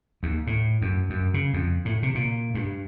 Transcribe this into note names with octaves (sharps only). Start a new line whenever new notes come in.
D#2
A2
F#2
F#2
C#3
F2
A2
C3
A#2
G2